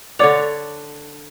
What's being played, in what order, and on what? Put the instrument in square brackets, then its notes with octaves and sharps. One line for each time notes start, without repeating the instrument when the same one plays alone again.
[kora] D3 C#5 F#5 [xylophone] D5 D6 F7